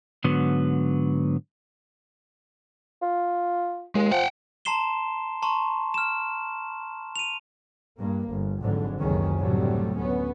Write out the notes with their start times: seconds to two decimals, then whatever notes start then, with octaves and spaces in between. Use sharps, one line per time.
0.24 G#2 D3 F#3 B3
3.02 F4
3.95 D#2 G#3
4.11 F3 F#5 G5
4.65 A5 A#5 C6 C7 E7 G7
5.42 A5 A#5 C6 C#6
5.94 F6 E7
7.16 D#7 F7
7.99 G2 A#3
8.29 G1
8.62 G#1 F2 G#2 D3 F#3
9.00 F#1 C#2 C3 D#3 C#4
9.39 D2 A2 C3 F#3 G3 A3
9.98 D2 B3 C#4